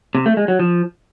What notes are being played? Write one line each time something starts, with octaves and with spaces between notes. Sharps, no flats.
C3
A3
G#3
F#3
F3